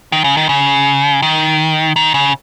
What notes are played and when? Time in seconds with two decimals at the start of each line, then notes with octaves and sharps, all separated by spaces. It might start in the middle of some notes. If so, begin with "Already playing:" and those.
0.12 D#3
0.24 C#3
0.37 D#3
0.49 C#3
1.22 D#3
1.96 D#3
2.14 C#3